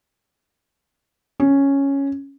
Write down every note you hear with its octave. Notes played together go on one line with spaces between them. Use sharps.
C#4